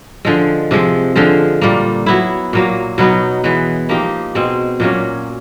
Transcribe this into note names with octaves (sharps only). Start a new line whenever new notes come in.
D3 F3 G#3
C3 F3 G#3
D3 F3 G#3
A#2 G3 A#3
F#3 B3 E4
A#2 F#3 A#3
B2 F#3 B3 D#4
E3 G#3 B3
F3 A#3 D#4 G4
B2 G#3 C4
A#2 F#3 A#3 C#4